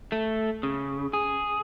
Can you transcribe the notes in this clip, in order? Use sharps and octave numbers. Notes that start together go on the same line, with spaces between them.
A3
C#3
G#4